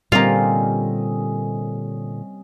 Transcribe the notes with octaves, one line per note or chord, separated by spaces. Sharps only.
A#2 D3 G3 A#3 C4 C#4 F4 D#5